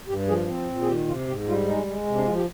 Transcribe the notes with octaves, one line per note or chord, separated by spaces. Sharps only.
G2 G4
F3 G#4
C4
A#2
G#4
D#3 G4
C3 F4
G#2 G4
G3 F4
G#3 D#4
G#3
C3
D4
F3 F4
G4